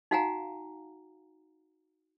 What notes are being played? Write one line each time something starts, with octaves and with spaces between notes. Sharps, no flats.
D#4 F#4 F5 F#5 G#5 A#5